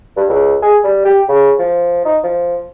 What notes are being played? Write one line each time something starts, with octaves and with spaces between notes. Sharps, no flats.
G2
C#2
G#4
G3
G4
C#3
F3
D#4
F3